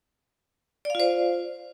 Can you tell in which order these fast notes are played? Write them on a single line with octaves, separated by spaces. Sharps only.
D5 F5 F4 C5